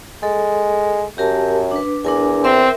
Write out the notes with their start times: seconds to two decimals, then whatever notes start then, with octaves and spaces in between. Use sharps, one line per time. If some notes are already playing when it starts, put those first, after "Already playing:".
0.23 G#3 A4
1.18 F#2 G4 A#4 A5
1.72 D4 B4
2.05 E2 D4 A#4 G#5
2.44 C4 A#4 E5